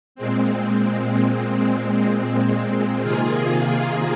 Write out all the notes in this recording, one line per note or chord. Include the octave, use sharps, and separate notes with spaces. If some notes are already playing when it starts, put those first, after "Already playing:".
A#2 G#3 C4
C3 D#3 A#3 F4 G#4